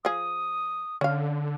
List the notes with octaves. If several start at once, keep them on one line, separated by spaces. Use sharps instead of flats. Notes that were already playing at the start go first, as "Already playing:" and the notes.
F3 G#4 D#6
D3 C#4 F5